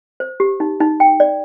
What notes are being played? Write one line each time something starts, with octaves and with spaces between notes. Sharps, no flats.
C5
G4
D#4
D#4
G5
D5